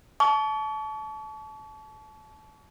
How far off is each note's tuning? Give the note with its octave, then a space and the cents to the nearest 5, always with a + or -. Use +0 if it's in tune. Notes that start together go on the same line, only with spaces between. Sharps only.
A5 -25 C#6 +40